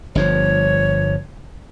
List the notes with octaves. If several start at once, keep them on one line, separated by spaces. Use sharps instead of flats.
G1 G2 F3 C#5